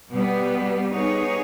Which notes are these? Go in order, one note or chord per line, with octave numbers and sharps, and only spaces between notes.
B2 G3 B3
G3 B3 D#4 G#4 C#5